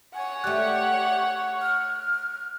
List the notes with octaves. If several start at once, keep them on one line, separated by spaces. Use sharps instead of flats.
C#5 F#5 G#5
A3 G4 D5 F#6
F6